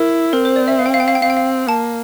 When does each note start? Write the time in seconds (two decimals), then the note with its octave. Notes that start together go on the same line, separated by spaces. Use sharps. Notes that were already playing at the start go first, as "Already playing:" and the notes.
Already playing: E4 A#4
0.33 C4 A#4
0.45 C5
0.56 D5
0.68 E5
0.79 F5
0.86 G5
0.94 F5
1.00 G5
1.08 F5
1.15 G5
1.22 C4 F5
1.30 G5
1.37 F5
1.69 A#3 A5